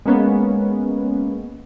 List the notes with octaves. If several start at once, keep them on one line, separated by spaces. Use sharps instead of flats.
G#3 A#3 B3 C#4